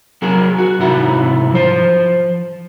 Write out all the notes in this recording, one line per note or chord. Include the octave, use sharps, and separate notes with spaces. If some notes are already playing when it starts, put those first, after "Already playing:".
F#3 F#4 G#4 A#4
F#4
C2 G#2 E4 F#5
F3 C5